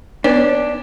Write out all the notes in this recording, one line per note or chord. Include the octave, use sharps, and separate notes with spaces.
B3 D4 B4 C#5